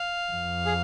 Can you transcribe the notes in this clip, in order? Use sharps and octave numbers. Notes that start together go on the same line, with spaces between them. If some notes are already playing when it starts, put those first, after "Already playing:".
Already playing: F5
F2
G#4